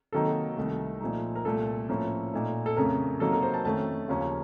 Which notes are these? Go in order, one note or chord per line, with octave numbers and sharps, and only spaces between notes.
C3 D#3 F#3 A#3 D#4 A4
C2 C3 D#3 A3
A#2 F3 A3 D#4
A#4
C2 A#2 A3 A4
A2 F3 A#3 C#4
A#2 A3 D#4
A4
F2 C#3 A3 C#4 A#4
C3 F#3 A#3 D#4 A4
A#4
C5
A5
F2 D#3 A3 C#4 A5
D#2 C#3 F3 A#3 C#4